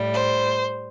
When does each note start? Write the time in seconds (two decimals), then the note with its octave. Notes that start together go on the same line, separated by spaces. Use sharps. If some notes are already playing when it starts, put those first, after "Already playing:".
Already playing: A2 G3
0.15 C5